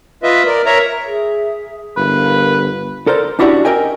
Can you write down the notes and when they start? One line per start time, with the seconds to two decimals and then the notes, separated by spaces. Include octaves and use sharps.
0.23 F4 B4 D#5 E5
0.46 A#4 D5
0.66 A#4 C#5 E5 A#5
1.05 G#4 E5
1.97 G1 E4 A#4 B4 F5
3.07 A4 A#4 C5 D5
3.39 C#4 D4 E4 F#4 G4 D5
3.65 A#4 D#5 E5 G5 G#5